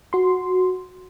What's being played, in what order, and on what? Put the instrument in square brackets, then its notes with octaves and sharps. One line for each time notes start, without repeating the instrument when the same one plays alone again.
[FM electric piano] F#4 C6